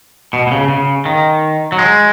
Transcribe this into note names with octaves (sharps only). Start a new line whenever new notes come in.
B2
B2
C#3
C#3
D#3
F#3
G#3